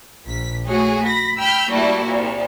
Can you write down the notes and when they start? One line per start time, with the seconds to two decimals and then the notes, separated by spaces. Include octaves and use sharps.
0.25 A#1 B6
0.68 A3 F#4 G#4 C#5
1.07 B5 A#6
1.40 G5 B5 E6 F6 G6
1.73 G3 A3 A#3 E4 F#4
2.06 C2 A#2